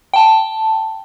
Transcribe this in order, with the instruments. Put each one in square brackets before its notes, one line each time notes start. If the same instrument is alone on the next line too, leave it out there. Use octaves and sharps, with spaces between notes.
[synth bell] G5 A5